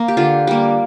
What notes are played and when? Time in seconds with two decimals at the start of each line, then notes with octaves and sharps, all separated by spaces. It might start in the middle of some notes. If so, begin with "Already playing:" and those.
Already playing: A#3
0.08 G4
0.17 D3 F4
0.47 G3 A#3